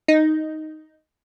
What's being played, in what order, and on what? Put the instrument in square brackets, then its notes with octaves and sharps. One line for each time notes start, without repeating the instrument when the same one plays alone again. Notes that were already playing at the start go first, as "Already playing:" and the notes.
[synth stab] D#4